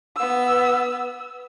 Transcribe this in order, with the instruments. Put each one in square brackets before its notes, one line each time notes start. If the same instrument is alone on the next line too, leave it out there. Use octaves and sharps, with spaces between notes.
[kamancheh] B3 E6